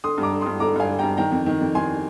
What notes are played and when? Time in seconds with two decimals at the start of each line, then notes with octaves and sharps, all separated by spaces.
0.04 D3 C6 D#6
0.18 G2
0.23 A#5 D6
0.33 D3
0.41 G2 C6 D#6
0.60 D3 A#5 D6
0.76 G2 F5 G#5
0.89 D3
0.99 G2 G5 A#5
1.17 D#3 G5 A#5
1.31 F2
1.46 D#3
1.61 F2
1.75 D#3 G#5 C6